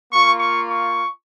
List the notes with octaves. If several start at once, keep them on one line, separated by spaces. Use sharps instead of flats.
A#3 F4 C#6
C#6
C#6